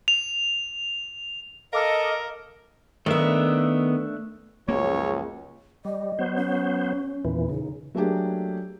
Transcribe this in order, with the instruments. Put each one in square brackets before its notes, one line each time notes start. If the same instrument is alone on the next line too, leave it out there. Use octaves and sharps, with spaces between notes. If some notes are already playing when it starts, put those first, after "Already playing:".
[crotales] F7
[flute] A4 [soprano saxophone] A#4 [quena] D#5 [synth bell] F5 D6 F6
[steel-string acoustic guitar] D#3 B3 [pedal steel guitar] A3 D4 E5
[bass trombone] C#2 [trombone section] F#2 C#3 F3 [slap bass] A#3 [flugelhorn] C#5
[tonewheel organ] G3 [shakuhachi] D#5
[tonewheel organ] F#3 B3 C5
[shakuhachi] C#4
[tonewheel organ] E2 A#2 E3
[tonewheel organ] C#3 [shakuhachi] D#4
[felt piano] F#3 A3 A#3 D4 G4 G#4